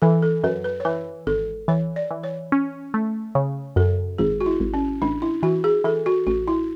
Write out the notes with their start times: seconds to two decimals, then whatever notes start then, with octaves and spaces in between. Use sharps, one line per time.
0.02 E3 A4
0.22 A4
0.44 F#2 B4
0.64 B4
0.80 C#5
0.85 E3 B4
1.27 G#1 A4
1.68 E3 C#5
1.96 D5
2.11 E3
2.23 C#5
2.52 C#4
2.94 A3
3.35 C#3
3.76 F#2 A4
4.18 G#1 G#4
4.40 F#4
4.46 E4
4.60 G#1
4.74 C#4
5.02 A1 D4
5.22 E4
5.43 E3 F#4
5.64 G#4
5.84 E3 A4
6.06 F#4
6.27 A1 F#4
6.48 E4